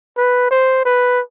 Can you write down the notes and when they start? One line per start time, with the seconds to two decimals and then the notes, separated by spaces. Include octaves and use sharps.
0.17 B4
0.51 C5
0.85 B4